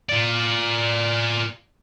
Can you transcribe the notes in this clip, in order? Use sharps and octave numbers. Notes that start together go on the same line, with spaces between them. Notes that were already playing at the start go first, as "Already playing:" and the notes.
F4 D5